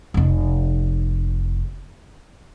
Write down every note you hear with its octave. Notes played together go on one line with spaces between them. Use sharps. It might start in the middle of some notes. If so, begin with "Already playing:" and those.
F1 D#4